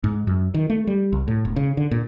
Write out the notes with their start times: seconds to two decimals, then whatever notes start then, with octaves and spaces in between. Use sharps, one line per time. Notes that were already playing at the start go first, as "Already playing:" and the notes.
0.04 G#2
0.27 F#2
0.54 D#3
0.70 A3
0.87 G3
1.13 C2
1.28 A2
1.45 E1
1.56 C#3
1.77 D3
1.91 A#2